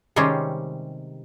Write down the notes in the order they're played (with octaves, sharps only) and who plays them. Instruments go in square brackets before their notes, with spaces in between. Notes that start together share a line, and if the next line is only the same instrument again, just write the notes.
[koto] C3 D#3 G3 G#3 C4 C#4